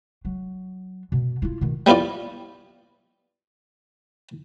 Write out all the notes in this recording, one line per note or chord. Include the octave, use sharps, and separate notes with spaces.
F#3
B2
E4 F4
B2 D#3
G3 B3 E4 F4 D5